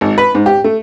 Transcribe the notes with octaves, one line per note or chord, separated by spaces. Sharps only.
G#1
B4
G#2
G4
A3